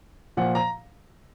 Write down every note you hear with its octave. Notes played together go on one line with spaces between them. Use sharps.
A#2 F3 F#5
A#5